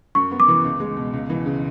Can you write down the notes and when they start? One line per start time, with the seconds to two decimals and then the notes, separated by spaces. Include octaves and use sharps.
0.15 F#2 C#6
0.32 B3
0.40 D6
0.48 E3
0.64 C#2
0.80 G#3
0.97 B2
1.13 C#2
1.30 E3
1.46 C#3